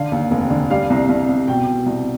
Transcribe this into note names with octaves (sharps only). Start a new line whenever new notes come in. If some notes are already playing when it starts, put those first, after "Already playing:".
Already playing: D3 F5
D#2
F1
D3
G3 F5
C2
C2
C2
B2 G5
B2
C2